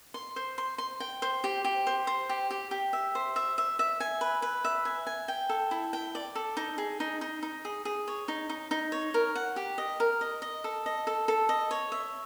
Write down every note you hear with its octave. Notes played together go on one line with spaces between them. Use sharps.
C6
C5
C6
C6
G5
C5
G4
G4
C5
C5
G4
G4
G4
E5
C5
E5
E5
E5
G#5
B4
B4
E5
G#5
G#5
G5
A4
E4
G5
D5
A4
D#4
G#4
D#4
D#4
D#4
G#4
G#4
C#5
D#4
D#4
D#4
C#5
A#4
F#5
G4
D#5
A#4
D#5
D#5
A4
D#5
A4
A4
D#5
C#5
E5